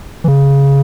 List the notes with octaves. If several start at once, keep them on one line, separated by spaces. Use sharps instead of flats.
E3
C#3